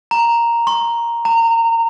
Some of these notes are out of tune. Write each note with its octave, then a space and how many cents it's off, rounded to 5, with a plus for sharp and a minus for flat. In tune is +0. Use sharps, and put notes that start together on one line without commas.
A#5 +0
C6 +40
A#5 -25